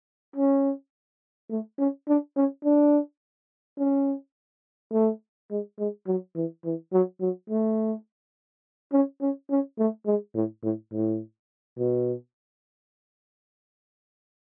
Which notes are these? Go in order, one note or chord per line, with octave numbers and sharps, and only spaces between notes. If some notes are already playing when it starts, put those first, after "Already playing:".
C#4
A3
C#4
D4
C#4
D4
C#4
A3
G#3
G#3
F#3
E3
E3
F#3
F#3
A3
C#4
C#4
C#4
A3
G#3
A2
A2
A2
B2